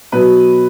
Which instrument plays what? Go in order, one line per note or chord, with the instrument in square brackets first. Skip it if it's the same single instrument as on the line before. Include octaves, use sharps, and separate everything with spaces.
[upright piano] B2 F#3 B4